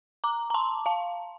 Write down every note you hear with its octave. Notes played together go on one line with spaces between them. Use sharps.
A#5 D6
A#5
A5 C6
F5 A5